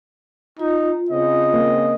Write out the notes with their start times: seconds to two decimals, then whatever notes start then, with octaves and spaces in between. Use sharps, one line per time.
0.59 D#4 F4
1.11 C#3 C4 D#5
1.54 A#3